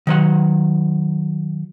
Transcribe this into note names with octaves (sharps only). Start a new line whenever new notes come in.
D#3 F#3 F#5